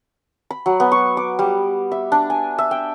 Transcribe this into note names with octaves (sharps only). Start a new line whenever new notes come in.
B5
F#3
B3
C#6
D6
G3
E5
D4
G#5
E5
G5